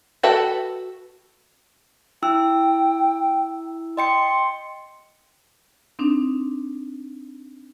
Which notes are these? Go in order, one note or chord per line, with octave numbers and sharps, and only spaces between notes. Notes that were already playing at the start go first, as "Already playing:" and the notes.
F#4 A4 B4 G5 A5
E4 G5 E6
D#5 G5 C6 C#7
C4 D4 D#4